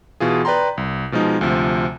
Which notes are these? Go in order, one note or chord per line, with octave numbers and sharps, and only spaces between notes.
B2 E3 F4 G#4
B4 D5 G5 A#5 C6
C2
B2 F3 G#3 D#4
D2 C3 F3